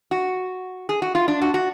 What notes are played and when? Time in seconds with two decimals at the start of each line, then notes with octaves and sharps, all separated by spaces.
0.11 F#4
0.89 G#4
1.02 F#4
1.15 F4
1.28 D4
1.42 F#4
1.54 F#4